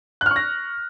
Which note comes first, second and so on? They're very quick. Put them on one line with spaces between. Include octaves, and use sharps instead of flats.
F#6 F6 C#6 A#6